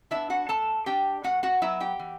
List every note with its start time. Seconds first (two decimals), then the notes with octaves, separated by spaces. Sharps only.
0.11 B3 D4 E4 E5
0.30 F#4 F#5
0.48 A2 A4 A5
0.86 G3 D4 G4 G5
1.23 A2 F#4 F#5
1.43 F#4 F#5
1.62 F#3 B3 E4 E5
1.80 G4 G5
1.99 E3